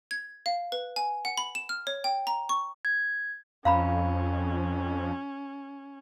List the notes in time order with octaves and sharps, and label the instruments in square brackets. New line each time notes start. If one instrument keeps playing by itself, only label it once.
[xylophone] G#6
F5
B4
G#5
F#5
B5
E7
F6
C#5
G5
A#5
C#6
[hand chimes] G#6
[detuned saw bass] F2 [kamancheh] C#4 [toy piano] F5 A#5 B5